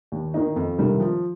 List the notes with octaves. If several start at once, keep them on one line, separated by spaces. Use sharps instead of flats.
D#2
D#3 A#3 D#4
F2
C3 D#3 G3 A#3
F3